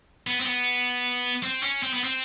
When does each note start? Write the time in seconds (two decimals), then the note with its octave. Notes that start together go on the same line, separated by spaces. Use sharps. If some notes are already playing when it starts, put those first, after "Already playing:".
0.27 B3
0.40 C4
0.46 B3
1.43 C4
1.63 C#4
1.83 C4
1.93 B3
2.04 C4